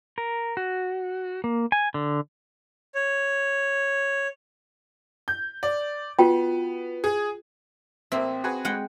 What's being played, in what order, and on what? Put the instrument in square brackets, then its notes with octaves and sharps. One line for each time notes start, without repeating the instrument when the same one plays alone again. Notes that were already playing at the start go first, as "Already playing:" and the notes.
[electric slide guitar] A#4
F#4
A#3
G#5
D3
[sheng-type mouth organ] C#5
[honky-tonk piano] G6
D5
[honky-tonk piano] B3 [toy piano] F4 F#4 G5
[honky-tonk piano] G#4
[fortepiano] A1 A#3 E5 [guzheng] C4
[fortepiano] F#4 G#4 B4
[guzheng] G#3 F#5 G5